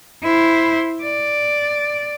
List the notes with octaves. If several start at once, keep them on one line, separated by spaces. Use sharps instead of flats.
E4 C5
D5